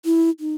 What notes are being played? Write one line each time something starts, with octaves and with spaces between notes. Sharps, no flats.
E4
D#4